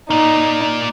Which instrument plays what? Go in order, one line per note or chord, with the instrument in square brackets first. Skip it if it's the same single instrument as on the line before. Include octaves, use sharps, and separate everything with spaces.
[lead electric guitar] A#3 D5 [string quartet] D#4